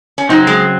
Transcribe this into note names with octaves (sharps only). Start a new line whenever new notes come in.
C#4
C#3 F#3 C4 D#4
G#3